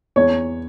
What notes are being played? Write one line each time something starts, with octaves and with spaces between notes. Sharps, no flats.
E2 C#5